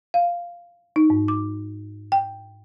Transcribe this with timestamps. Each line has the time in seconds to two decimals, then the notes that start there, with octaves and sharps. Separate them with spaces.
0.14 F5
0.96 D#4
1.10 G#2
1.28 D6
2.12 G5